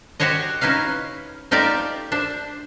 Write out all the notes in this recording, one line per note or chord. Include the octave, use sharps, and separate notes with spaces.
F#4 G4 C5 C#5 D#5
C#4 D#4 E4 B4 F5
A3 D#4 F4 G4 D5 E5
D4 C5 E5